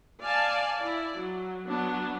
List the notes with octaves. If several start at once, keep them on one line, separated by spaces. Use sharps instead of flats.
D5 F5 G#5 A5
E4 D5
F#3
F#3 B3 D4